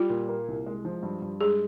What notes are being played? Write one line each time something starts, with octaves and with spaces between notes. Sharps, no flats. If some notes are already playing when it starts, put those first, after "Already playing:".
Already playing: G3 F4
A#2
A#3
C2
G#3
F3
G2
G2
G#3 G#4